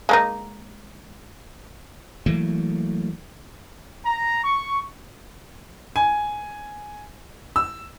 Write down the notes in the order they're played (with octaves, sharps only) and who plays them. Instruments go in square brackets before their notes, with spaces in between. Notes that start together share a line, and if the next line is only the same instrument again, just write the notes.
[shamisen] G#3 A#3 D#4
[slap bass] E3 F#3 A3 A#3
[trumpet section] A#5
C#6
[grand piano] G#5
E6